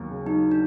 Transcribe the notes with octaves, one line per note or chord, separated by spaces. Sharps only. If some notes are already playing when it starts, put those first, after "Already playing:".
Already playing: D#2 F#3 A#3
C#3
F#3 D#4
D4